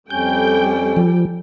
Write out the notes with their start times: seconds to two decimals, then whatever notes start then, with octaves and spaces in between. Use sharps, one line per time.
0.10 F2 G3 C#4 A4 G5 G6
0.97 F3